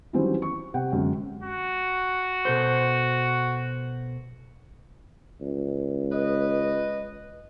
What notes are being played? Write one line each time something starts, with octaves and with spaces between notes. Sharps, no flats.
D#3 E3 F#3 G3 C#4 C5
C#6
C3 F#5 G5
F#2 D3 G#3
F#4
B2 A4 C5
C#2
B4 D#5